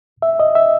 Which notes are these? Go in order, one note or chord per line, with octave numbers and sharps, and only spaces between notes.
E5
D#5
E5